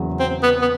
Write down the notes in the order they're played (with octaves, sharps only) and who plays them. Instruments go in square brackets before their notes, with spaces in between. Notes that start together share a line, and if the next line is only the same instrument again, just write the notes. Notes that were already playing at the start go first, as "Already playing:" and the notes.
Already playing: [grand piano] E2 C#3 F#3 A#3
[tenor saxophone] C4
B3
B3